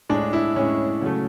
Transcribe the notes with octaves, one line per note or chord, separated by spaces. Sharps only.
A2 G#3 D4
E4
A2 G#3 C#4
C#3 F#3 A3